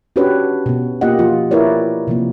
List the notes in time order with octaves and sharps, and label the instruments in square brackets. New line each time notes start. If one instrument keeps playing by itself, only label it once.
[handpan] C#4 D4 F#4 G4 B4 C#5
B2 B3
A#3 F4 G4 D#5 F#5
F3 F4
E4 A#4 B4 C#5 D5
C3 F3 A#3